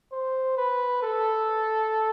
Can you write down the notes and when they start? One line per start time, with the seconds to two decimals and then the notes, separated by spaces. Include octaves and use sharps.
0.12 C5
0.57 B4
1.03 A4